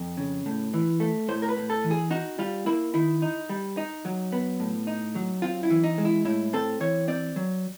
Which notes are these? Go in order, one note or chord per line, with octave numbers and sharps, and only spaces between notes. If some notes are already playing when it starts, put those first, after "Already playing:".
Already playing: F2
C#3
A2
E3
A3
A2 C5
A#4
B4
A2
A4
E3
G#4
D#4 F#4
G3 F4
A#3 E4
D#3 E4
D#4
G3
D#4
F#3
B3
A2
D#4
F#3
C4 F4
E4
E3
D#4
G#3
E4
A2 E4
C4 A4
E3 C#5
C4 D5
F#3